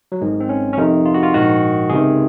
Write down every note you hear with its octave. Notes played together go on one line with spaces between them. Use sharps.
F#3
G#1 G#2 D#3 G#3
C4
C#4
C#4
F2 C3 D#3 D#4
F4
F#4
F4
A#1 G#2 D#3 F#4
C#2 C3 D#3 G#4